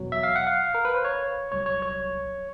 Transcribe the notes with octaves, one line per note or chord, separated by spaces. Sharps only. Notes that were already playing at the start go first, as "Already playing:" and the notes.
Already playing: E2 B2 F#3
E5
F5
F#5
F5
A#4
B4
C5
C#5
C2 A#2 F#3 C#5
C#5
C#5